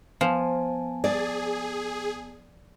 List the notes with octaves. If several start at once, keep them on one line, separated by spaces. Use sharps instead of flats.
F3 B3 G#5 A5
G#4 D5